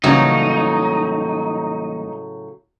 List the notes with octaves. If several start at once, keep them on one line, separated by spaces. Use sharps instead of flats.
A2 C#3 E3 F#3 G3 A#3 D#4